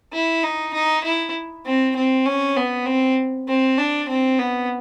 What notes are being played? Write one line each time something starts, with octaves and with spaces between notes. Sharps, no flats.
E4
D#4
D#4
E4
C4
C4
C#4
B3
C4
C4
D4
C4
B3